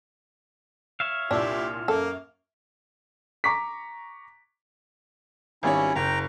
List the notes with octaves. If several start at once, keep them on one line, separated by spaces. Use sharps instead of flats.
C#5 E5 F5
C2 A#2 D4 E4 G4
F#2 A#3 A4
A#5 C#6 D6 B6
G#1 G3 C#4 E4 C#5
F#1 G5 A#5